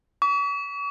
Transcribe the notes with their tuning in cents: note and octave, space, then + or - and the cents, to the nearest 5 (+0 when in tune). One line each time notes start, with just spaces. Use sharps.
C#6 +45